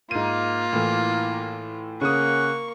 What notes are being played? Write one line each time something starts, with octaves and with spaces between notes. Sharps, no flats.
G#2 A#3 F4 D#7
A2 E3
C#3 A#3 C#4 F#5 C#6 D#6